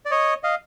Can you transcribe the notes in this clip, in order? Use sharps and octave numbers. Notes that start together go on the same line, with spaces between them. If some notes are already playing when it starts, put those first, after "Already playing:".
D5
C#5 D#5
D#5 F5